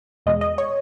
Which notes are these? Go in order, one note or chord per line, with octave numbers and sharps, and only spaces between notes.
E2 B2 G#3 D#5
D#5
C#5